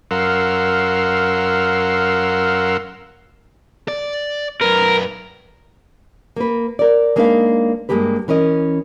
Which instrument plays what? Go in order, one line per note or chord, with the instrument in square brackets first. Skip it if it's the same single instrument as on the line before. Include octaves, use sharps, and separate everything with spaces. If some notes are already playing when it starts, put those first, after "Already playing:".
[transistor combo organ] F#2 A#4 F5 F#5 C6 E6
[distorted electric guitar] D5
[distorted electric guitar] F#2 B4 [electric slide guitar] A#4
[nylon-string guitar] A#3 B4
A#4 D5
G#3 A#3 D4 D#4 B4 F5
G2 C3 G#3 A#3 G4 B4
E3 C#4 A#4 D#5